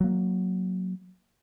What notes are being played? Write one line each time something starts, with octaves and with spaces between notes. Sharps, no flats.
F#3 A#3